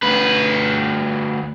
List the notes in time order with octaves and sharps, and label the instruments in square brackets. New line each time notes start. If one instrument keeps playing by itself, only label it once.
[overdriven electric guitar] D2 B4